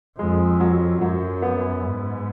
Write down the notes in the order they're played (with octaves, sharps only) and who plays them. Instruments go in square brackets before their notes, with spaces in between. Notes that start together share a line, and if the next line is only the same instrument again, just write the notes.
[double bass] F2 [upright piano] G#3
[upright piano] F#3
[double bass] F#2 [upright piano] F#3
[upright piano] B3
[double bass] G#2